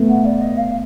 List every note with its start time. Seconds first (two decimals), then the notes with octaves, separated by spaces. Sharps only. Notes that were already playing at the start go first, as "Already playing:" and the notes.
Already playing: A3 B3
0.09 F#5
0.25 D5
0.41 D#5
0.57 F5